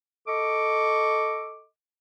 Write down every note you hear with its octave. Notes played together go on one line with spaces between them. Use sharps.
A4 D#5 C#6 D6